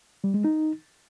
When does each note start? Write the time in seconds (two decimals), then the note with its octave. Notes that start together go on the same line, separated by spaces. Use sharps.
0.24 G3
0.34 G#3
0.44 D#4